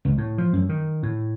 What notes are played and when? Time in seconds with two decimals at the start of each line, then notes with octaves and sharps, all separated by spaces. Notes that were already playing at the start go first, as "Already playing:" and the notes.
0.05 C#2
0.18 A2
0.38 F3
0.53 F#2
0.69 D#3
1.03 A2